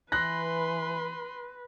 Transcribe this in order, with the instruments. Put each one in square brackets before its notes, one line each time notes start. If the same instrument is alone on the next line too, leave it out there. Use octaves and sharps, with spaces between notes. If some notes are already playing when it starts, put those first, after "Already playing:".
[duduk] E3 [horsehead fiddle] B4 [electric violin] B5 C6 [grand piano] F#6 A#6